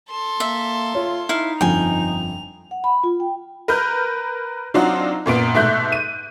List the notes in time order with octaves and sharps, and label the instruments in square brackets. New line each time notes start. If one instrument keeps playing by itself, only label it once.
[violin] A4 C6
[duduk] A#3 [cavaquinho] E5
[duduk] F4 [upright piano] C#5
[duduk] D#4 [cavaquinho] E4 F5
[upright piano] G1 F2 F3 [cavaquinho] G5 G#5 [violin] F7
[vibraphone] F#5
B5
F4
G5
[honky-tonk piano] A#4 B4 F6 G6
F#3 C4 D4 D#4 F4 F#4
F#2 A#2 B3 D7
G#2 B2 A3 E5 F#6 G6
D#7